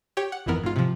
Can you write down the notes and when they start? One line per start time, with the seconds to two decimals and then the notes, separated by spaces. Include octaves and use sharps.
0.17 G4 C#5 G5
0.32 F#5
0.46 G#1 F2 E3 B3 A#4
0.63 G#2 F4
0.76 C3 F3